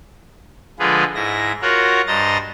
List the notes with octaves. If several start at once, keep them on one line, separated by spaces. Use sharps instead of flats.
D3 F3 G#3 F4 G#4 B4
G#2 E4 A#6
F4 F#4 A#4 C#5 F#5
G2 C5 D#5 A#5 A6